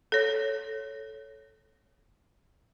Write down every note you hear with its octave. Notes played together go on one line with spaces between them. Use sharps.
A4 C#5